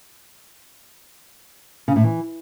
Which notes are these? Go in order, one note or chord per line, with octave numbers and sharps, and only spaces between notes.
C#3
A2
E3